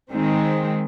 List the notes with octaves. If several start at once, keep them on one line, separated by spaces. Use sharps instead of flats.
D#3 G#3 C4